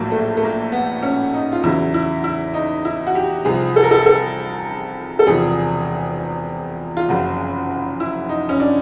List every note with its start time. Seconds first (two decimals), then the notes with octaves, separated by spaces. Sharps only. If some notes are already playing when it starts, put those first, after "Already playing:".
Already playing: A#1 A2 F#3 A#3
0.12 A3
0.37 A3
0.43 A#3
0.72 B3
1.02 C#4
1.34 D#4
1.53 F4
1.63 E2 C#3 F#3 E4
1.94 E4
2.24 E4
2.54 D#4
2.85 E4
3.07 F#4
3.15 G4
3.45 C2 C3 F3 G#4
3.76 A4
3.83 A#4
3.91 A4
4.06 A4
5.19 A4
5.27 E1 E2 C3 F3 G#4
6.97 F4
7.09 F#1 F2 C#3 F#4
8.00 E4
8.29 D#4
8.49 C#4
8.60 D4